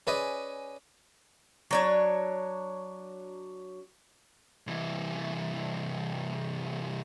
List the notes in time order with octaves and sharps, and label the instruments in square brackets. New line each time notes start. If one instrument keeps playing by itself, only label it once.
[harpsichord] C#4 G#4 B4 D5 D#5
[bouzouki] F#3 D4 C#5
[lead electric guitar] C2 E3